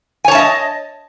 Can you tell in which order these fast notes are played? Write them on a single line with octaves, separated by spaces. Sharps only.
G#5 C#5 A5 E5 D#5